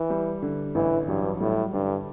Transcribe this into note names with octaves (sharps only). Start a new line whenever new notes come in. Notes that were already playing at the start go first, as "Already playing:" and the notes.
Already playing: E3
G3
D3
A1 E3
G2 F#3
A2 G3
G2 D3